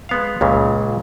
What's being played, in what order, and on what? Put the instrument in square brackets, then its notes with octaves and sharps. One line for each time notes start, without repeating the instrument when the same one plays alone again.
[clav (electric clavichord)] G#3 B3 F5
C#2 A#2 C#3